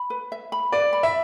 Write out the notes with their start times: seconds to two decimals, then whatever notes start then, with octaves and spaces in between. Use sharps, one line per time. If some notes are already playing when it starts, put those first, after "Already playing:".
Already playing: B5
0.10 B4
0.32 E5
0.52 B5
0.72 B4 D5
0.93 B5
1.03 E5